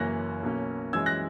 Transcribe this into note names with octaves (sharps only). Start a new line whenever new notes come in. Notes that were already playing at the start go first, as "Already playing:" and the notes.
Already playing: F#1 F#2 E3 A#3 C#4 F#6 A#6
B1 B2 A#3 C#4
F#2 E3 G#3 E6 G#6
F#6 A#6